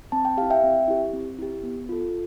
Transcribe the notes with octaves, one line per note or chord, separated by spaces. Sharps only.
C4 A5
G5
E4 G4 F5
E5 G5
C4
E4 G4
C4
E4 G4
B3
F4 A4